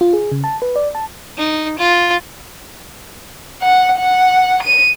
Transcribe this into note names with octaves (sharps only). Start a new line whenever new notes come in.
F4
G#4
C#3
A5
B4
D5
A5
D#4
F4
F#5
F#5
D#7